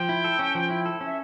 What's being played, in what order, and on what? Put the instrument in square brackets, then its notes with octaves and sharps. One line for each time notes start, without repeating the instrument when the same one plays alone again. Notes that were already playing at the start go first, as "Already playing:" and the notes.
Already playing: [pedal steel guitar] F3 [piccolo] G5
[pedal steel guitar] E4
A4
C#4
F3
E4
A4
C#4
[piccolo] E5